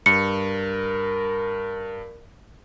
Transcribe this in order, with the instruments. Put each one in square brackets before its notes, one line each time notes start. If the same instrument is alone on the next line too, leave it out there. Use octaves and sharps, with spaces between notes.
[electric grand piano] G2 [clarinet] A#4 [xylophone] C#7